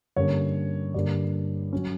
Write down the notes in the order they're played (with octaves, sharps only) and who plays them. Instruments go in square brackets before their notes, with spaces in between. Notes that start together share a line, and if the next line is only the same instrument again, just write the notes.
[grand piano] G2 D3 A#3 C#4 C#5
G2 D3 A#3 D5
F#3 C#4